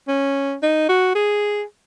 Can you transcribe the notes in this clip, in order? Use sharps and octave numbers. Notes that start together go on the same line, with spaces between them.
C#4
D#4
F#4
G#4